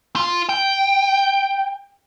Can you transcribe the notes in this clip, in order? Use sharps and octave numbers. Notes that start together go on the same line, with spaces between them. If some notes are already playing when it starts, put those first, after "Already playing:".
F4
G5